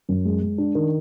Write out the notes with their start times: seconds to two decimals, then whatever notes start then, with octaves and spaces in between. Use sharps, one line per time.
0.09 F#2
0.25 G#3
0.42 G#3
0.58 D4
0.75 D#3